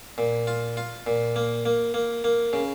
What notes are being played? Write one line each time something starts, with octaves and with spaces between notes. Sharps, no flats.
A#2
F4
F4
A#2
A#3
A#3
A#3
A#3
C#3